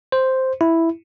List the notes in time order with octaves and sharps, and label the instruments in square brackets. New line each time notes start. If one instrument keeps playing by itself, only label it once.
[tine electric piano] C5
E4